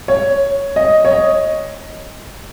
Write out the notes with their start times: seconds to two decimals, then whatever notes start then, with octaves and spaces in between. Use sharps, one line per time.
0.08 C#5
0.76 D#5
1.05 C#5
1.11 D#5